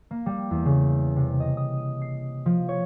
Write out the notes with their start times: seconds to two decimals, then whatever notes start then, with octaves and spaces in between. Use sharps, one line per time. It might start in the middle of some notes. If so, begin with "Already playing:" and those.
0.11 A#3
0.26 G3
0.51 E2
0.65 C#3
1.16 C3
1.40 D#5
1.57 D#6
1.78 D#7
2.01 C7
2.46 F3
2.69 C#5